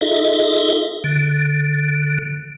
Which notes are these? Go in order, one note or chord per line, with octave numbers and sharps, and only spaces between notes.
D#4 F4 G#4 A4 D#5 E5
D3